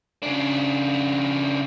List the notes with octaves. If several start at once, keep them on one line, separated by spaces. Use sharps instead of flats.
C#3 D4